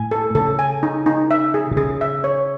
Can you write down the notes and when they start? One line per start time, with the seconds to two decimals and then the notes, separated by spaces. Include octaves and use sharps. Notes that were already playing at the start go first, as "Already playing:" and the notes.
Already playing: A2 G#5
0.11 A4
0.35 C#3 A4
0.59 G#5
0.83 D#4
1.06 D#4
1.31 E5
1.54 G#4
1.71 B2
1.77 C#3 G#4
2.01 E5
2.24 C#5